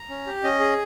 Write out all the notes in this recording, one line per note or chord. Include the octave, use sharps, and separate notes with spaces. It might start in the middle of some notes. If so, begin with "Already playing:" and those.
Already playing: A#5
C#4
G4
C#4 D#5
G#4